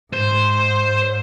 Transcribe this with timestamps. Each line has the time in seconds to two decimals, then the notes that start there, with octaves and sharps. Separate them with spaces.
0.13 G#2 C5